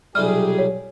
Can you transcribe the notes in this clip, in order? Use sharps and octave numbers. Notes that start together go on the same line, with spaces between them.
B1 C3 G3 F4 G4 G#4 F6
C#5